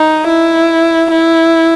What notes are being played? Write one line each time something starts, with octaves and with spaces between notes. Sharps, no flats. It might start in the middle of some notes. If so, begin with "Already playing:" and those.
Already playing: D#4
E4
E4